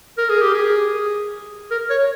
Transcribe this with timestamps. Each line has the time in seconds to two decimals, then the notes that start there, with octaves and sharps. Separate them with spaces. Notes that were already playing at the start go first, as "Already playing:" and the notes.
0.18 A#4
0.29 G#4
0.42 G4
0.54 G#4
1.71 A#4
1.90 C#5